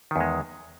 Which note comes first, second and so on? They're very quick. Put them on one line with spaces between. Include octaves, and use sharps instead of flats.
D#3 E2 G#3